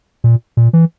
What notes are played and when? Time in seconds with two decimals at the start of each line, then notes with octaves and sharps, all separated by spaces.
0.24 A#2
0.57 A#2
0.73 E3